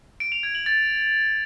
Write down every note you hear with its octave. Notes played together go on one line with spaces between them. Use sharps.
D7
F7
G#6
F#7
A6